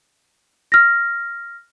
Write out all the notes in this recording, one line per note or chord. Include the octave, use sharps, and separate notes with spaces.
F6 A#6